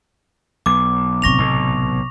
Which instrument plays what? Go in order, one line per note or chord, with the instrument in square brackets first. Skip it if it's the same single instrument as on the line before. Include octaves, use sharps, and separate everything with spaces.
[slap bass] B1 [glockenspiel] D6
[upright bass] A1 C3 [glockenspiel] C#6 A#6 F7
[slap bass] B1